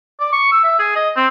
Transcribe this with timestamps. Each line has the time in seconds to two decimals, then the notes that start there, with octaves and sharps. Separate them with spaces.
0.20 D5
0.33 C#6
0.52 E6
0.64 E5
0.79 G#4
0.96 D#5
1.16 C4